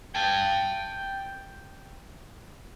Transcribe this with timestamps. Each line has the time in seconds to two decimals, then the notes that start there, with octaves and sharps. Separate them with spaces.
0.15 G5 A5